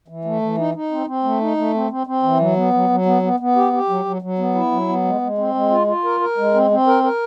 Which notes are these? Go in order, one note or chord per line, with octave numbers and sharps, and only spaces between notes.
E3
A3
E3
D#4
D#4
C4
C4
A3
D#4
A3
C4
C4
C4
E3
F#3
B3
F#3
F#3
B3
B3
B3
G4
G4
F#3
F#3
F#3
B3
E4
F#3
B3
G#3
G#3
C4
G#3
F4
F4
A#4
A#4
G#3
C4
C4
A#4
A#4